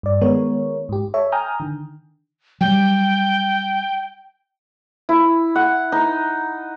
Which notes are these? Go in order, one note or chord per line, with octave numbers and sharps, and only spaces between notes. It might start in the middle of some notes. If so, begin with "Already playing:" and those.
G2 D5
D#3 G#3 B3 A#4 C#5
G#2 G4
A4 C#5 E5
G5 G#5 A#5 D#6 F6 G6
D3 D#3
F#3 G3 G5
E4
F#5
D#4